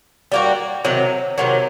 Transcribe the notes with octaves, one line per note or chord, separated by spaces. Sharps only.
G3 A#3 F#4
C3 D#3 F#3
C3 D#3 F#3